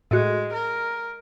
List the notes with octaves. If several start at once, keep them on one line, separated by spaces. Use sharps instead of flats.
A2 G#3 F#4
A#4